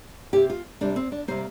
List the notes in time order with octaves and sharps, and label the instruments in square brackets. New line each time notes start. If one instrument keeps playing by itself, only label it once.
[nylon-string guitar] C3 A#3 G4
F4
C3 G3 A#3 D4
C4
D4
C3 G3 A#3 C5